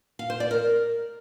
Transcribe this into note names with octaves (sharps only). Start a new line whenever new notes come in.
F5
C5
D5
A#4